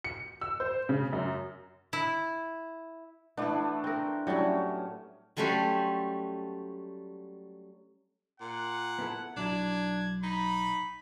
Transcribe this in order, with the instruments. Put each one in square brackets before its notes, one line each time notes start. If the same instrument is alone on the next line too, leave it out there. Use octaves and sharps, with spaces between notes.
[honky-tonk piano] C#7
E6
C5
C#3
F#2
[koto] E4
[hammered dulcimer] E3 A3 D4 [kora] B3 E4
[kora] C4 A#4
[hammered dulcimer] A2 C#4 [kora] F#3 G3 E4
[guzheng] F#3 G3 A3 C#4 F#4 C5
[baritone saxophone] A#2 [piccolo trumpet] F#5
[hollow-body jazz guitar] B3 E4 A4
[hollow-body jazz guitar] B1 F#3 E4 [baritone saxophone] D4 [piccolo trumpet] G#6
[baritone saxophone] D#4 [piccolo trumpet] B5